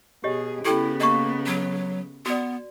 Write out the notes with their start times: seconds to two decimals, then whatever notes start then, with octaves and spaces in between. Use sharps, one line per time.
0.24 B2 G4 G#4 C#5 D#5
0.65 C#3 B3 E4 G4 A4 G5
1.00 A#3 D#5 A#5 C#6
1.46 F#3
2.26 B3 F#4 D5